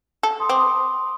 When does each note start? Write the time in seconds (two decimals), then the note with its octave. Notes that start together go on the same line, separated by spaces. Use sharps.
0.23 A4
0.40 C6 D#6
0.49 C4 D6
0.57 C6 D#6